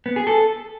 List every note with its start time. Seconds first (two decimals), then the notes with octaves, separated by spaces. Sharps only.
0.06 B3
0.16 G#4
0.27 A4